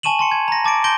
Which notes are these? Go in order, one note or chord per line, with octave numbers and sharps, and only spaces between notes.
G#5 A5 C#6 D#7 E7 F#7
A5 C6 C#7
G#6
A#5 A#6
A5 D6 A6 D7
A5 C6 G6 A#6 D7 G7